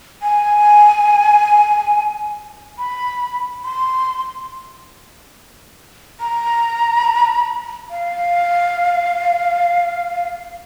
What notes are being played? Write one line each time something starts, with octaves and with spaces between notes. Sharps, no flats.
G#5
B5
C6
A#5
F5